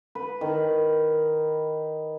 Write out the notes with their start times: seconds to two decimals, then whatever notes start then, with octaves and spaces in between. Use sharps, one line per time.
0.15 B4
0.41 D#3